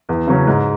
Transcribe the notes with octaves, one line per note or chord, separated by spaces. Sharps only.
E2
C#3 F#3 C#4
G#2